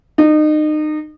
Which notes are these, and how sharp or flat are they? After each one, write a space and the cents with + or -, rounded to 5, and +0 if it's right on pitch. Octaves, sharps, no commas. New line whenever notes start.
D#4 -30